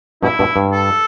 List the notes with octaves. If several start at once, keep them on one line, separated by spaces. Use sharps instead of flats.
G2 B2 E4
G2 B2
G2
A4